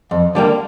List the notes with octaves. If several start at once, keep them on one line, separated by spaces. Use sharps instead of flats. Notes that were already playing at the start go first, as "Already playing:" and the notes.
F2
D3 G3 A#3